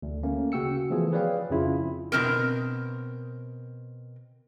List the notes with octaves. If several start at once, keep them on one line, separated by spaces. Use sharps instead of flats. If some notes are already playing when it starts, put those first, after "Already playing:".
D2
A3 A#3 C#4
C#3 F#4 G5 E6 C#7
E3 F3 A3 B3 G#4
G#4 B4 C#5 D5 F5 G5
F2 C#3 E4 F4
B2 G#3 C4 A#4